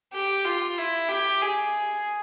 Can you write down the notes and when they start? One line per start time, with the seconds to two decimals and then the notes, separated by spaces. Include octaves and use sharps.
0.13 G4
0.45 F4
0.77 E4
1.08 G4
1.41 G#4